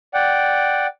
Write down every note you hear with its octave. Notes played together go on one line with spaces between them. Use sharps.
D5 F#5 G5